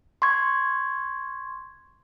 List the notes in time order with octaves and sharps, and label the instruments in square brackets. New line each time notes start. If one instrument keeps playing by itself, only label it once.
[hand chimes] C6 C#6 G#6